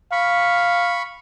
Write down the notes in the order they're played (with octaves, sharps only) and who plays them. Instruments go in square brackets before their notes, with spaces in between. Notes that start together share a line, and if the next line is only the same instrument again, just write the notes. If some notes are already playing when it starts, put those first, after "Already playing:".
[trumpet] F5 [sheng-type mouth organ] B5 C#6